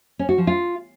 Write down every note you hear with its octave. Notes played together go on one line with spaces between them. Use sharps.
C#4
F#4
F3
F4